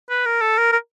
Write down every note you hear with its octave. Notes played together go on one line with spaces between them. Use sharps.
B4
A#4
A4
A#4
A#4